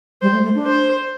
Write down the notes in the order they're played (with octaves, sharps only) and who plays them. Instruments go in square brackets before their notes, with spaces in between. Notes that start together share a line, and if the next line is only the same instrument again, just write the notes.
[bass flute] G3 [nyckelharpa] C5
[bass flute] A3
A3
D4
[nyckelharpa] C5